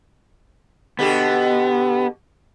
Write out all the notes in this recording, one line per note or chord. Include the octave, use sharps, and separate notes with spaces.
B2 D3 B3 G4